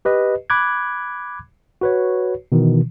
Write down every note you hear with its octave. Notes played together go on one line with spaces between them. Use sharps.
G4 B4 D#5
B5 D6 F#6 G#6
F#4 B4 C#5
B2 D#3 E3